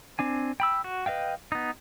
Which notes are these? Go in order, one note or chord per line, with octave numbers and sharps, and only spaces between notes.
C4 D4 G#5
G5 B5 E6
F#4
B4 D#5 F5 G5
B3 D#4